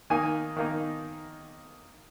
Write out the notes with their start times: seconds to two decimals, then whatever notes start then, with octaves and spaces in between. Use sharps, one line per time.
0.10 D#3 A#3 D#4 G#5
0.56 D#3 A#3 D#4